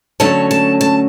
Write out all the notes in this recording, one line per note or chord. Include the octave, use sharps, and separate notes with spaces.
D3 F#3 A3 C#4 A5
A5
A5